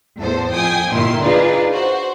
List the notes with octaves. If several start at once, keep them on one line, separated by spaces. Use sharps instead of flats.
E2 A2 A4 C5
F2 G5 G#5 D#6
G1 A#2 D#3 E4 C6
D4 D#4 F4 G#4 B4 D5
F#4 C5